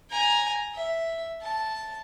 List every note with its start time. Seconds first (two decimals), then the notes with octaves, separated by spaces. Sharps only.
0.10 G#5 A#5
0.74 E5
1.42 A5